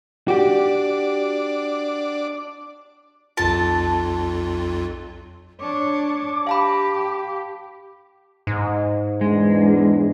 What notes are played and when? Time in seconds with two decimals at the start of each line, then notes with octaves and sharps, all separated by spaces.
0.28 D4 F#4 G4 D5
3.37 B1 F2 F4 A5
5.60 D4 C#5 D6
6.47 G4 F5 A5 B5
8.47 G#2
9.21 E2 G#3 D4